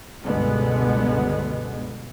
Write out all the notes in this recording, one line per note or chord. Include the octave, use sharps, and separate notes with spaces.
G1 C#2 B2 D3 G#3 B3